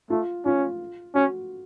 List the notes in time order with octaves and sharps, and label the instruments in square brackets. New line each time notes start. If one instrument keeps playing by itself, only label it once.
[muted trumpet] A3 [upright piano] F4
[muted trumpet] C#4 [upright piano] F4
[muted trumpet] C#4 [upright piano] F#4